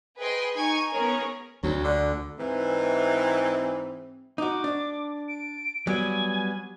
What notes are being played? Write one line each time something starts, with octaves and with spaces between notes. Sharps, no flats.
G#4 B4 D#5 G5 C6
D#4 G#5 C#6
B3 C#4 G#4 A#4 C#5
D2 F#3
D3
G#2 E3 C4
D#4 F#4 D6
D4
D7
F#3 G3 B3 G#5